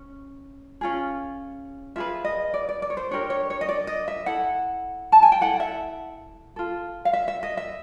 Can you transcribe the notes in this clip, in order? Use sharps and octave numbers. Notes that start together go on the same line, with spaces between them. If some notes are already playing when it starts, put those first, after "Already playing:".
Already playing: C#4
C#4 F4 G#4
F4 G#4 B4 E5
D#5
D5
D5
D5
C#5
C5
D4 G4 A#4 C#5
C#5
C#5
D#5
D5
D#5
E5
E4 A4 F#5
A5
G#5
G5
E4 A4 F#5
E5
F4 A4
F5
E5
E5
D#5
E5